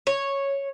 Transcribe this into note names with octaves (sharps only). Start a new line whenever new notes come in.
C#5